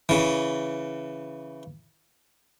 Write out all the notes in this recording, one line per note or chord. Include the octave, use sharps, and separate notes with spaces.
C#3 E3